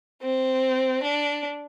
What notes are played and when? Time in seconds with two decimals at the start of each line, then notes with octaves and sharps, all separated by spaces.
0.22 C4
1.03 D4